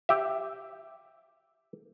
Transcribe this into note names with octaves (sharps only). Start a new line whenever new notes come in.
G4 E5